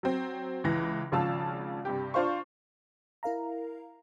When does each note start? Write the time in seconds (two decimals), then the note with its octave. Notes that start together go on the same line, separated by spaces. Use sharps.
0.03 F#3 C4
0.64 C#2 E3 A#6
1.12 G#1 C#3 F3 F5 A5 E6
1.85 G2 C3 G4
2.14 D4 F4 C5 F5 C#6
3.23 E4 A#4 F5 A#5